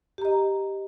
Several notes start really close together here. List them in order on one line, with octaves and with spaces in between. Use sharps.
G4 A#5 D#5